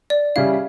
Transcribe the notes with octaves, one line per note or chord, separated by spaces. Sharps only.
D5
C#3 G3 C#4 E4 F5